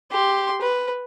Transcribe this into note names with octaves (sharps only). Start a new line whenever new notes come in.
G4 C6
B4